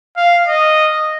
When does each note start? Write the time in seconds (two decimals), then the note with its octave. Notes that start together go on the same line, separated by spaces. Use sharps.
0.17 F5
0.47 D#5